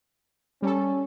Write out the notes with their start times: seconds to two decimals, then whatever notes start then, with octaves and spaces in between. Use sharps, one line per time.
0.62 G3 C#4 A4